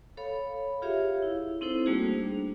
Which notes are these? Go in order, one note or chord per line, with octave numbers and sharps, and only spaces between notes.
A4 C#5 F5 B5
F4 G4 G#4 C#5 E5 F5
E4
C4 D#4 E4 A4 C5
G3 A3 A#3 D4 F#4 G#4
D4